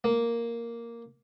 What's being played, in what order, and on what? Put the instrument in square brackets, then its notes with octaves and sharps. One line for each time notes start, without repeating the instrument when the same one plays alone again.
[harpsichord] A#3